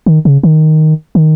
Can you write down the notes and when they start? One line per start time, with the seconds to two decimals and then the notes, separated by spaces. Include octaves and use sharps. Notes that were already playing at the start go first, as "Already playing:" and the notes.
0.06 D#3
0.25 C#3
0.43 D#3
1.15 D#3